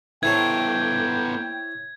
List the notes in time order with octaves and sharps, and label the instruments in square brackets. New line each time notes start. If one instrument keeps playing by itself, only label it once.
[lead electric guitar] B3 A4 [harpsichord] E4 C5 C#5 [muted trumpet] G5 [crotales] G#6